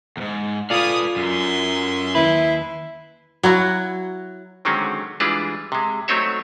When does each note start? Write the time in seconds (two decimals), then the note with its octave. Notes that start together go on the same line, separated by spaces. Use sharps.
0.17 E2 G#2
0.70 F4 A4 B4 D5 F5 G#5 D#6
1.16 F#2 G#3 E5 C6
2.15 D#2 E4 B4
3.43 F#3 E4 F#4
4.65 D3 D#3 F#3 G#3 C4 C#4
5.20 E3 G3 G#3 D4 F4 B4
5.72 C3 G#3
6.08 F#3 A3 C4 D#4 C#5 E5